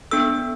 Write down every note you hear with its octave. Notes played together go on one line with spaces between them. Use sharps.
B3 D4 A4 E6